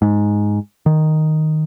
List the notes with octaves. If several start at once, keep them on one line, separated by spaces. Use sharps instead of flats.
G#2
D#3